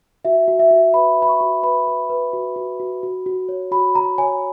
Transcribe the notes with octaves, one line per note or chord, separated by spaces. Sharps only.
F#4 E5
F#4
E5
F#4
B4 B5
B4
B5
C#6
F#4
B4 B5
B4
B4
F#4
F#4
F#4
F#4
F#4
C#5
F#4 B5
F#4 A#5
C#5 G#5